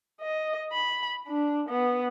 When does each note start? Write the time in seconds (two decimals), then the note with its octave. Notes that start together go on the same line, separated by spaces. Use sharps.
0.21 D#5
0.72 B5
1.28 D4
1.69 B3